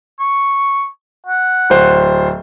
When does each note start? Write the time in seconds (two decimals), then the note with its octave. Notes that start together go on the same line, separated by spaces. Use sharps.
0.20 C#6
1.26 F#5
1.70 D1 C5